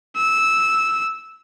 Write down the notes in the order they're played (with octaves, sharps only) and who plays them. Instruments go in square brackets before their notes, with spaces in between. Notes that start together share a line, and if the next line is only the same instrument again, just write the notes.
[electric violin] E6